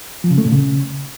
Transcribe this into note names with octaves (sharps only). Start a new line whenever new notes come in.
F3
C#3
A3
A#2
C#3